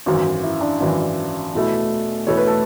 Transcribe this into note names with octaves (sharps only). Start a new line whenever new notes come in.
G#1 F#2 E3 F#4
E4
D4
G#1 F#2 E3
E2 B2 A3 E4
E2 B2 A3 E4 C#5
B4
A4